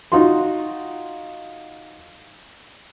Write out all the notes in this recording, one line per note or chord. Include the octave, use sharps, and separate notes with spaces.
D#4 F4 F#4 C6